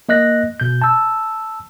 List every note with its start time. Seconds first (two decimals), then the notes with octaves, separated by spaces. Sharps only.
0.09 A#3 D#5 F#6 A#6
0.60 B2 G6
0.82 A5 E6